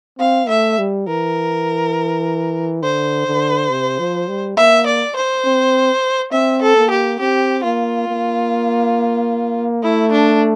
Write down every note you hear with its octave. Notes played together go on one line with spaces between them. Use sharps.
C4 F5
A3 E5
G3
E3 A#4
D3 C5
D3
C3
F3
G3
A#3 E5
D5
C5
C4
C4 E5
A4
A#3
G4
C4 G4
A#3 F4
A#3
A3 E4
D4